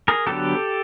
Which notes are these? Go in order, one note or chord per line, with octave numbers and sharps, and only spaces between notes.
G#4 A#4
D3 F#3 B3 G4 A4